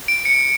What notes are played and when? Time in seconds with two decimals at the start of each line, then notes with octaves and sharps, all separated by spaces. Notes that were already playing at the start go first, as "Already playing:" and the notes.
0.08 D7
0.25 C#7